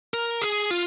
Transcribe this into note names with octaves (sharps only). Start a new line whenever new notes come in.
A#4
G#4
F4